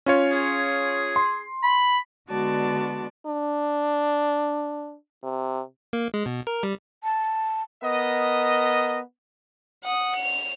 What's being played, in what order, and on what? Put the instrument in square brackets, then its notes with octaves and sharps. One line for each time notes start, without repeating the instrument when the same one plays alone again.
[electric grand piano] C#4 F4 C#5
[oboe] G#4
[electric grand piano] C6
[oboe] B5
[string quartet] D3 G#3 B3 F#4 D5 A5
[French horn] D4
C3
[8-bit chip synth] A#3
G#3
B2
A#4
G3
[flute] A5
[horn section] B3 A#4 D#5
[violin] F#5 D#6
F7